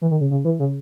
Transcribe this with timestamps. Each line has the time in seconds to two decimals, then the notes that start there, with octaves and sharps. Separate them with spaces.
0.01 E3
0.11 D#3
0.21 C#3
0.31 C#3
0.45 E3
0.59 C#3